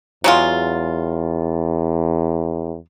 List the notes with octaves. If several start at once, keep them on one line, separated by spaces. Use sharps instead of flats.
E2 F#3 G#3 F4